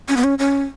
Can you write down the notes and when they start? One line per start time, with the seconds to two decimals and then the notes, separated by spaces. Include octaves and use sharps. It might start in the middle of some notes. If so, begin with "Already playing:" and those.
0.09 C#4
0.17 B3
0.24 C#4
0.39 C#4